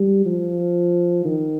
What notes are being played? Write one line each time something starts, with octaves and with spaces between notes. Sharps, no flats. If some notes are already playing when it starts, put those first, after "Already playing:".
Already playing: G3
F3
D#3